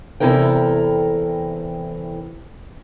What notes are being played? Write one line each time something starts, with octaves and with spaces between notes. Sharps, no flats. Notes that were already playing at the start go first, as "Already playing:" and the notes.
E2 C3 E4 A4 A#4 G5